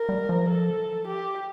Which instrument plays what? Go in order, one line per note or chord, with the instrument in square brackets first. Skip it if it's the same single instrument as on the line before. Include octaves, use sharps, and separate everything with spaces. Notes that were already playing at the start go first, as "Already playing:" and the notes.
Already playing: [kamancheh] A#4
[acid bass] G3
F3
[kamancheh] A4
G4